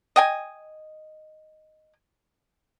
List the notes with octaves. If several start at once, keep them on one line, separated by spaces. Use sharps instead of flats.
D#5 G5 G#5